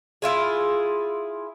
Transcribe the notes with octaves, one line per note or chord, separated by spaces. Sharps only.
E4 F4 G#4